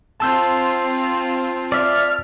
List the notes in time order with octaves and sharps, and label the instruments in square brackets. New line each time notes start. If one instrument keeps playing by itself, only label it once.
[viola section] C4 F4 [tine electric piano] A5 E6 G6
[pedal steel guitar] D5 E5 [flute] F6